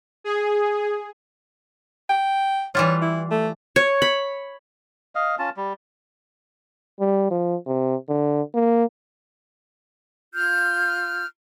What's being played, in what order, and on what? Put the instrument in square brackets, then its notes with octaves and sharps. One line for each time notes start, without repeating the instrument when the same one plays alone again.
[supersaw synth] G#4
[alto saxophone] G5
[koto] E3 G3 F4 [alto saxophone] C#5
[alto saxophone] E4
A3
[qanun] C#5
B5
[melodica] D#5 F5
C#4 F4 A5
G3
[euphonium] G3
F3
C3
D3
A#3
[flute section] F4 F6 G6